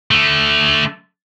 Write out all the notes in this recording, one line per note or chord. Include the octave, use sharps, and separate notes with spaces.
D3 A3